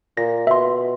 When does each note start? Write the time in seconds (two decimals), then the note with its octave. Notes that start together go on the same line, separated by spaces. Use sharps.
0.17 A#2 A#6
0.47 B2 E5 C6